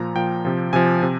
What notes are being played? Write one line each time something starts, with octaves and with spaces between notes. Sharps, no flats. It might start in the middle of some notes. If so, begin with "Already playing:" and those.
Already playing: A#2 F3 A#5
A#2 F3 G5
C3 F3
C3 F3 G#5
C3